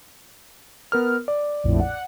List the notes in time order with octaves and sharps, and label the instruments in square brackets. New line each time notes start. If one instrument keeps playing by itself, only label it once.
[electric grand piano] B3 A#4 F6
D5
[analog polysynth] A#1 F2 A2
F#5